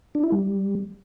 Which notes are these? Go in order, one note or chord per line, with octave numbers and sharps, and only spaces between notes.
D4
E4
G3